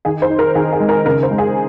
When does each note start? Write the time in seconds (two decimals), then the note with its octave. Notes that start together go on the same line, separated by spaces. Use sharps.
0.05 D#3 G#4
0.22 C5
0.30 D#4
0.39 A#4
0.55 D#3 G#4
0.72 G#4
0.80 G#3
0.89 A#4
1.05 C#3 A#4
1.23 C5
1.30 G#3
1.38 G#4